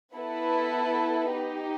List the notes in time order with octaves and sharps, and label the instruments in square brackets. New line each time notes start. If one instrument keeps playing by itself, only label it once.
[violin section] B3 E4 A4 B4
D#4 G4